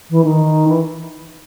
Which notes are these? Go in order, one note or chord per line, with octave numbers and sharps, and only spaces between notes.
E3
D#3
E3